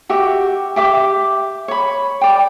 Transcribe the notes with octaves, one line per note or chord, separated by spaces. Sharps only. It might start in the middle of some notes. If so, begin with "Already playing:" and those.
F#4 G4 E5
G4 E5 D6
C#5 B5
D5 G5